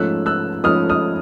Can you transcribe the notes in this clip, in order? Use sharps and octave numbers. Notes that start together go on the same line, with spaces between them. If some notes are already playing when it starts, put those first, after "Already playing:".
Already playing: G#2 F3 A3 C#4 E6 F#6
E6 F#6
G#2 F3 A3 C#4 D#6 F6
D#6 F6